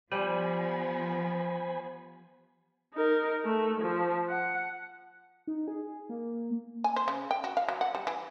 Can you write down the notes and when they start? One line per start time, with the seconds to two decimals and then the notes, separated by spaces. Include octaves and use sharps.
0.12 F3 G3 B3 C5 G#5 B5
2.94 D#4 A#4
3.45 A3
3.81 F3
4.29 F#5
5.47 D#4
5.68 G#4
6.09 A#3
6.84 G#5
6.96 C5
7.08 C#3
7.31 G5
7.44 F#4
7.57 F5
7.69 F#3
7.81 F#5
7.95 G3
8.07 E3